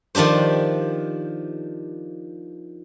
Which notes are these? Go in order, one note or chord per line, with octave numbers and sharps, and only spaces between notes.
D#3 F3 D4 G4 C5